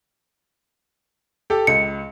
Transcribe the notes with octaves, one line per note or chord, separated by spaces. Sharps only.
G4 A4
C#2 C#7